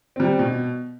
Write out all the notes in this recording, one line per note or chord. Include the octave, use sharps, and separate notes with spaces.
G3 C4
B2